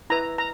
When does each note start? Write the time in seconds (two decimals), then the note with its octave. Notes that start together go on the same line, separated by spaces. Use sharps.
0.10 E4 B4 A#5
0.38 A#5